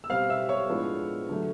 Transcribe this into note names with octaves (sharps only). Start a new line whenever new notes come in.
E6
B2 G3 C4 F5 F6
E5 E6
C#5 C#6
A2 F3 G#3 B3 D4
D3 F#3 A3